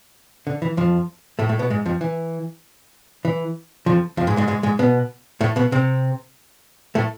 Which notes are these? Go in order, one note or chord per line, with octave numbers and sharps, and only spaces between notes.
D3
E3
F2 F3
A2 A3
A2 A3
B2 B3
G#2 G#3
F2 F3
E3
E3
F2 F3
F2 F3
G#2 G#3
G#2 G#3
G#2 G#3
G#2 G#3
B2 B3
A2 A3
B2 B3
C3 C4
A2 A3